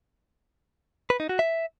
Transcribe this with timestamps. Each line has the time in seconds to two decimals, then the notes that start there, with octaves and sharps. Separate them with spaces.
1.10 B4
1.20 D#4
1.29 F#4
1.39 E5